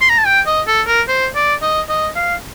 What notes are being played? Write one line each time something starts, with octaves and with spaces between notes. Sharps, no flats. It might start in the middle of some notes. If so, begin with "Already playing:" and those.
C6
A#5
A5
G5
D#5
A4
A#4
C5
D5
D#5
D#5
F5